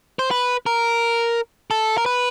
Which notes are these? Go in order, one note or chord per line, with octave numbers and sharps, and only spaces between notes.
C5
B4
A#4
A4
A#4
B4